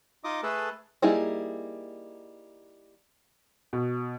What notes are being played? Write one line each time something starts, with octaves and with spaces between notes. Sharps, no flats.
D#4 F4 D#5 D6 D#6
A3 G#4 A4 B4 A5
G3 A#3 D#4 E4 G#4
B2